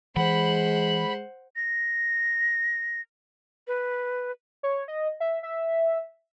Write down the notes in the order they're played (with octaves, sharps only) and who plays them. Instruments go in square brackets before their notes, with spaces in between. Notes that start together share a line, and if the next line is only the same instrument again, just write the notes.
[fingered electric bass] E3 [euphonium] G#3 [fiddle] C5 F#5 [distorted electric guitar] B5
[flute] A#6
B4
[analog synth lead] C#5
D#5
E5
E5